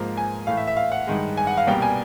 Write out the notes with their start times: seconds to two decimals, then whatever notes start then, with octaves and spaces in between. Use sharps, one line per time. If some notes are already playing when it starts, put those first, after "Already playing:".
Already playing: G#2 F3 A#3
0.17 G#5
0.47 A2 E3 A3 F5
0.57 E5
0.67 E5
0.77 F5
0.92 F#5
1.07 G2 D#3 G#3
1.37 G#5
1.47 F#5
1.57 F5
1.67 C2 B2 G3 A#3 G5
1.82 G#5